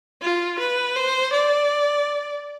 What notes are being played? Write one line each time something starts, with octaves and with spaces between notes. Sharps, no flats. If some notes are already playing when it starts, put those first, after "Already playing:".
F4
B4
C5
D5